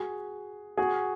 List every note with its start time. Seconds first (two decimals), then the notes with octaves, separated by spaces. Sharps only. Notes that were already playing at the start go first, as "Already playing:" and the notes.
Already playing: F#4 G#4
0.77 F#4 G#4